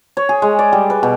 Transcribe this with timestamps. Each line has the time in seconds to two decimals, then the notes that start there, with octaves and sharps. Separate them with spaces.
0.17 C#5
0.29 G#4
0.42 G#3
0.59 D5
0.73 G3
0.90 B4
1.03 B2